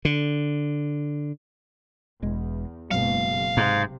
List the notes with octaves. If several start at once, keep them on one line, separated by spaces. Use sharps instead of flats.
D3
E1 E2 G#3
F#1 B2 F#3 G#3 F5
G#2 C3